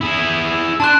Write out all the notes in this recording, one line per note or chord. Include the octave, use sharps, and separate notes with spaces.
E4 G#4
D4 A5 C6 F#6